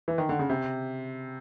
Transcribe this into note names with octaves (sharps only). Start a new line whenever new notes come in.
E3
D#3
D3
C#3
C3